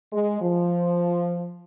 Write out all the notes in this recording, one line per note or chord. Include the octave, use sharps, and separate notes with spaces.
G#3
F3